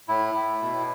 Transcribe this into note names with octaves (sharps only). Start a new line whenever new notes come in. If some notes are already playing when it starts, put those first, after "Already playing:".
A2 E4
A2
B2